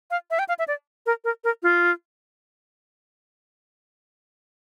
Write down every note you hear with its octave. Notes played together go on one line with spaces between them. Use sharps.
F5
E5
G5
F5
E5
D5
A#4
A#4
A#4
F4